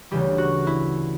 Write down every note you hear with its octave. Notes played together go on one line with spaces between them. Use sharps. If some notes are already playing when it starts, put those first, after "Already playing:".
D2 C#3 E3 G3 G4
F#4
E4